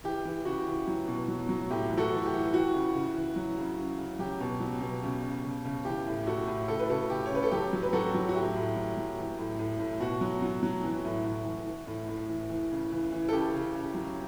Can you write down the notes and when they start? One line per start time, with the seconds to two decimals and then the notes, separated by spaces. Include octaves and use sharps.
0.04 E3 G4
0.25 E3
0.45 C#3 F#4
0.67 E3
0.87 F#3
1.08 B2
1.28 F#3
1.49 F#3
1.70 A2 G4
1.91 E3
1.97 F#4 A4
2.11 E3
2.26 G4
2.32 E3
2.54 E3 F#4
2.74 C#3
2.94 C#3
3.15 E3
3.36 F#3
3.58 C#3
3.77 C#3
3.98 C#3
4.19 F#3 G4
4.40 B2
4.60 F#3
4.81 B2
5.03 C#3
5.23 C#3
5.43 C#3
5.65 C#3
5.85 E3 G4
6.07 A2
6.27 A2 F#4 A4
6.47 A2
6.68 C#3 A4
6.79 B4
6.89 C#3 F#4 A4
7.10 C#3 G4
7.26 C#5
7.31 C#3 B4
7.43 A4
7.52 F#3 G4
7.73 F#3
7.83 B4
7.93 F#3 F#4 A4
8.14 F#3
8.29 F#4
8.35 A2 G4
8.56 A2
8.76 F#3
8.97 F#3
9.18 E3
9.38 A2
9.59 A2
9.79 A2
10.00 B2 F#4
10.21 F#3
10.42 F#3
10.63 F#3
10.83 E3
11.05 A2
11.26 A2
11.45 E3
11.66 E3
11.87 A2
12.08 A2
12.30 E3
12.49 E3
12.71 C#3
12.92 E3
13.12 E3
13.28 A4
13.33 C#3 G4
13.54 C#3
13.74 C#3
13.95 F#3